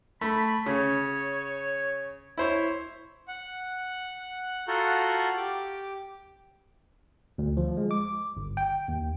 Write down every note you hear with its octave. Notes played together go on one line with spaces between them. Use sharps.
A3 B5
C#3 C#5
E4 C5 C#5
F#5
F4 F#4 A4 F#5 A#5 G6
G4 D6
D2
F3
G#3
D6
G1
G5
D#2